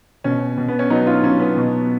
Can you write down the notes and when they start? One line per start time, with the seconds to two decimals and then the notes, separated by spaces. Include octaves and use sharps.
0.24 B2 C#4
0.58 B2
0.68 B3
0.79 C#4
0.90 F#3 B3 D#4
1.06 C#4 F4
1.23 F#3 C#4
1.39 B3
1.57 B2